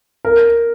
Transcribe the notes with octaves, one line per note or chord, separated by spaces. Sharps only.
A#4